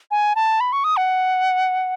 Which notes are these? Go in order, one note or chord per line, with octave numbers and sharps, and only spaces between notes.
G#5
A5
B5
C#6
D#6
F#5